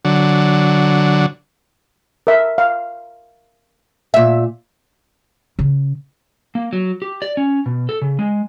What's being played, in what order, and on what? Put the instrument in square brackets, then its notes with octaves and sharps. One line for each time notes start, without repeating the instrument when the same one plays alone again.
[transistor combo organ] D3 F#3
[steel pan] A#4 E5
F5
[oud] A#2 E5
[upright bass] C#3
[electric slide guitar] A#3
F#3
G4
D5
C#4
B2
A4
C#3
G#3